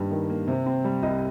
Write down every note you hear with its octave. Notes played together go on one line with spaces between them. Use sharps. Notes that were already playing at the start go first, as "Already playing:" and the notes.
Already playing: G2 D#3 G3 A#3
D#3
A#3
C3
C4
G3
C2 D#5